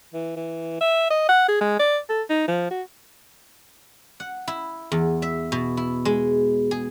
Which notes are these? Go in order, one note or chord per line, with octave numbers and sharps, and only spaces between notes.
E3
E3
E5
D#5
F#5
G#4
G#3
D5
A4
D#4
F3
F#4
F#5
E4
E2
E5
B2
E4
G#3
G#4